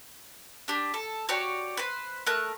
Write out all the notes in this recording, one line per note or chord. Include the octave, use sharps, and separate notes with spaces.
D4 G4
A4
F#4 G4 C#5 D5
B4 C5
A3 A#4 F#6